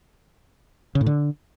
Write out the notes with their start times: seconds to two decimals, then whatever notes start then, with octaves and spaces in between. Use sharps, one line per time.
0.95 C#3
1.01 A2
1.06 D3